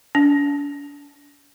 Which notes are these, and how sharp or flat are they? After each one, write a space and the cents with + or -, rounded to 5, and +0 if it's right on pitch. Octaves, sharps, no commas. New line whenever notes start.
D4 -40